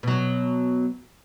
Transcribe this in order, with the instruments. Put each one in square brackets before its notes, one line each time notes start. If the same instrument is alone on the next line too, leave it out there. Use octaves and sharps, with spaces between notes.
[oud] B2 F#3